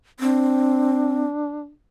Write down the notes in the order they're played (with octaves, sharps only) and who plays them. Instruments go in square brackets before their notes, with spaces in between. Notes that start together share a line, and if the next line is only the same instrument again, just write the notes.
[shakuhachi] C4 [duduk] D4